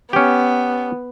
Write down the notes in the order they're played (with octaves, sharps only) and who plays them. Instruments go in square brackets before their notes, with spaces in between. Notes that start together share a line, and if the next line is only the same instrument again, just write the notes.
[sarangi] B3 [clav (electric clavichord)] C#4 G4